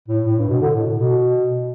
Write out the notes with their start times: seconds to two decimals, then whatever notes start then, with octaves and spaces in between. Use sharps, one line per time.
0.08 A2
0.26 A2
0.38 G2
0.49 B2
0.61 D3
0.73 A2
0.97 B2